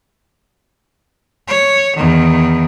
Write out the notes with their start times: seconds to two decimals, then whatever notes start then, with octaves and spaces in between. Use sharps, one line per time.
1.48 C#5
1.97 E2 D#3